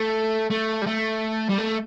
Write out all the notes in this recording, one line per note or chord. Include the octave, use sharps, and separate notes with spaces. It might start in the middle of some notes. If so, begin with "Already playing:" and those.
Already playing: A3
A3
G3
A3
G3
A3